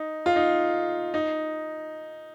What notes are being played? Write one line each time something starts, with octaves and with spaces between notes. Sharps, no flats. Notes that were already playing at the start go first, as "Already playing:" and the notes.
Already playing: D#4
F4
D#4
D#4